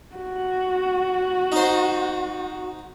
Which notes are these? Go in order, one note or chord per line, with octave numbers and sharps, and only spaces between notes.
F#4
D#4 C5